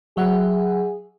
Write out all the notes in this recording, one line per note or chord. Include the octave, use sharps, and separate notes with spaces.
F#3 G#4 E5 F#5